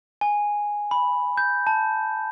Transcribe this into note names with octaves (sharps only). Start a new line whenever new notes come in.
G#5
B5
G6
A5